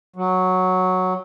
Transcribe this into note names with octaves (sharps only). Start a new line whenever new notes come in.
F#3